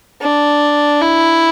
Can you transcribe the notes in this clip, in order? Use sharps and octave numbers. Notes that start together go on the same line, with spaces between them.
D4
E4